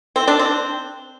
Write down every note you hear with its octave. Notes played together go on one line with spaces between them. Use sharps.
C4
D4
C4